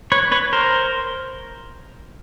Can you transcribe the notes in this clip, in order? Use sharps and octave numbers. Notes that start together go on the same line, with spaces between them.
B4 C#5
B4 C#5
A#4 C5